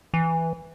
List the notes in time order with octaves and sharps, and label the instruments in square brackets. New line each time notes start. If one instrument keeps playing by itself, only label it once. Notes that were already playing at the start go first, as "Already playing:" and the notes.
[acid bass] E3